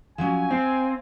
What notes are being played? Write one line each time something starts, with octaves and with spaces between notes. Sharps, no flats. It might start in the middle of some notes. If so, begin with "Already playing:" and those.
F3 F#3 C#4 G#5
C4 F5